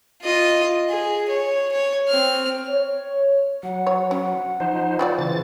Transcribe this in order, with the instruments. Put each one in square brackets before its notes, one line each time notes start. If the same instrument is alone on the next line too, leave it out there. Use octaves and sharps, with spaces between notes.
[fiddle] F4 D#5
G#4
C#5
C#5
C4 F6
[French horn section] C#5
[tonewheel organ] F#3 [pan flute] F#5
[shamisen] C#5
[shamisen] C#4 [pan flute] F#5
[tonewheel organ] F3 D#4 C5
[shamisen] F3 F4 D5
[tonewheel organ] C#3 E3 A6